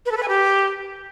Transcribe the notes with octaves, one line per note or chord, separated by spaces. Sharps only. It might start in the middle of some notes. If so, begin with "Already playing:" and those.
B4
A4
B4
G#5
G4